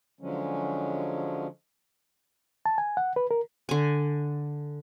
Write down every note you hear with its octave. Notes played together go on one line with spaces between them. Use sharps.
D3 F3 F#3 G#3 C#4
A5
G#5
F#5
B4
A#4
D3 G#5